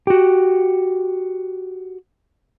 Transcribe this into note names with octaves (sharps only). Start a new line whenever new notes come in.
F#4 G4